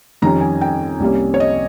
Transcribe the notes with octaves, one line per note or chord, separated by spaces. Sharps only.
F2 D#3 G3 C#4 A#5
G#5
G5
C2 C3 G3 A#3 C#4
C#5
D#5